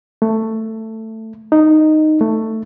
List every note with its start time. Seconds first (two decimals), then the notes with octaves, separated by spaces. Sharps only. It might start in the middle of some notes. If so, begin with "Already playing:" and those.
0.22 A3
1.52 D#4
2.21 A3